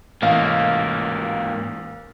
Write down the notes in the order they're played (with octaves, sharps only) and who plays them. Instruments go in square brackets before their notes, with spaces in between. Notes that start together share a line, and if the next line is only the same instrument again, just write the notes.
[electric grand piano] A1 F5 [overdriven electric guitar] G#2 A#3